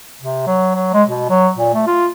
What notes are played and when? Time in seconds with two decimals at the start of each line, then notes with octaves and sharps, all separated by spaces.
0.21 C3
0.47 F#3
0.75 F#3
0.94 G#3
1.08 B2
1.29 F#3
1.57 A#2
1.74 A3
1.87 F4